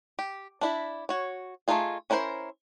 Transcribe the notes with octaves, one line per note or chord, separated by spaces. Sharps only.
G4
D4 E4 E5
F#4 C#5
A3 A#3 D#4 F4 G#4
C#4 D4 E4 A#4 C5